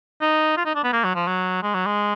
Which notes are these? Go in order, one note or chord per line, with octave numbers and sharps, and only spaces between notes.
D#4
F4
D#4
D4
B3
A#3
F#3
F3
F#3
G#3
F#3
G#3